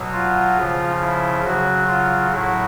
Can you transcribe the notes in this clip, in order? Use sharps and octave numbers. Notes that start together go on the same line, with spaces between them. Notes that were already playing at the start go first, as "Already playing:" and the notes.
Already playing: B2 F#3
F4
C#3 F3
E4
C#3 F#3 F#4
F4
A2 F#3 E4